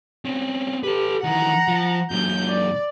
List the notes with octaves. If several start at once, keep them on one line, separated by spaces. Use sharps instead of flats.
C4 C#4
G4 A4 B4
D#3 E3 F#5 A#5
F3
F#2 A#2 G6
D5